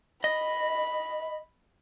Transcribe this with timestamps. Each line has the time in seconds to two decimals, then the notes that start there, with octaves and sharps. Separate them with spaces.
0.24 D#5 B5